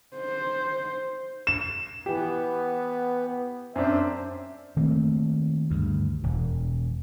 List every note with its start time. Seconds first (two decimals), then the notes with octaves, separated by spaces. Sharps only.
0.17 C5
1.47 E7
2.06 E3 B3 G4
3.76 F#2 C4 D4 C5 E5
4.76 D#3 A3 A#3 C4
5.70 D2 G2
6.23 E1